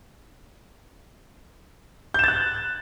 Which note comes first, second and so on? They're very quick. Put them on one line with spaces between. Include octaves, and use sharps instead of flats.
G6 E7 A6 F#6